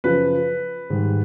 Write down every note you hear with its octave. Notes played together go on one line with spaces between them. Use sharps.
F#2 C#3 F3 B4
G#2 D#3 G3